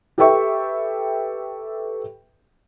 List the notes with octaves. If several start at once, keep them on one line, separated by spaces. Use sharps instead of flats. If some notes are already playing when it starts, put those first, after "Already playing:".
G4 A4 B4 E5 G5 C#6